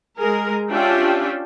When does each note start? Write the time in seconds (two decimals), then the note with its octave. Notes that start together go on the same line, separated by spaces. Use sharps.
0.18 G#3 G#4 A#4
0.70 C#4 D4 F4 G4 E5 G5